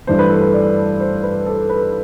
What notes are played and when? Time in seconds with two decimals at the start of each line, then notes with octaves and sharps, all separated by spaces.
0.07 G2 E3 A3 D4 C5
0.19 B4
0.30 A4
0.41 B4
0.54 D5
1.00 C5
1.23 B4
1.46 A4
1.70 B4